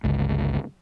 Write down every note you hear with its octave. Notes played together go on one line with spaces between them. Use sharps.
G1 C#2